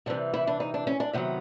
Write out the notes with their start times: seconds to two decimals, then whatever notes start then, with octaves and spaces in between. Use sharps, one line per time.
0.06 C3 E3 G3 D4
0.34 E4
0.47 D4
0.60 D#4
0.74 D4
0.87 C#4
1.00 D4
1.13 C3 D#3 F#3 B3